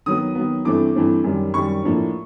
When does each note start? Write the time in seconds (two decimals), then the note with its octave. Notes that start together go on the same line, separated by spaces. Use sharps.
0.06 D#3 F#3 B3 D#6
0.35 D#3 F#3 B3
0.65 G2 E3 A3 C4 D6
0.95 G2 E3 A3 C4
1.24 F#2 D#3 G3
1.54 F#2 D#3 G3 C#6
1.83 A2 F3 A#3 D4